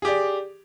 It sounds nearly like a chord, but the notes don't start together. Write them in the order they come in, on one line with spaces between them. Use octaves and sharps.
G#4 G4 D5